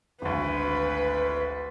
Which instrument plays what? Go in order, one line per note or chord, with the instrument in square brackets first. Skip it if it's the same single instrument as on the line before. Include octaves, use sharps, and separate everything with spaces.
[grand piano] G#1 D2 [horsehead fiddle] B4